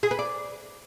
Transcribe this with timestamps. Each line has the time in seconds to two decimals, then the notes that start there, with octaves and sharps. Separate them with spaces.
0.03 G#4
0.11 B4
0.19 D5